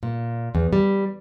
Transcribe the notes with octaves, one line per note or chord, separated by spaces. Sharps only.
A#2
E2
G3